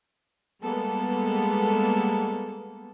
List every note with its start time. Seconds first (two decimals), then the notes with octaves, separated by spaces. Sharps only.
0.62 G3 G#3 A#3 B3 A4